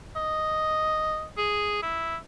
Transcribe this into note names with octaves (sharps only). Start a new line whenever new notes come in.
D#5
G#4
E4